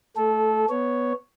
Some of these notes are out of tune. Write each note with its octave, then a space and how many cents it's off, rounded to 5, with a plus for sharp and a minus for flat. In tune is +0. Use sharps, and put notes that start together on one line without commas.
A3 +0 A4 -20
B3 +0 C#5 +0